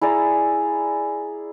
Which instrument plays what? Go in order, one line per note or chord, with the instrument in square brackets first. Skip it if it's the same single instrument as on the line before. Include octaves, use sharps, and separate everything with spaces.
[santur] E4 G#4 D5 A#5